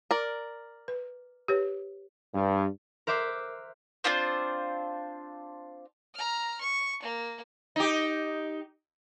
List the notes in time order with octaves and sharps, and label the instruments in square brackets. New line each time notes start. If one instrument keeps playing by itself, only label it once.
[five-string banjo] A#4 D5
[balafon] B4
G4 B4 C#5
[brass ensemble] G2
[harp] A#4 C5 E5 D6 F#6
[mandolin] C4 D4 F4 C5
[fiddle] A#5 F6
C#6
A#3
[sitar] D#4 G4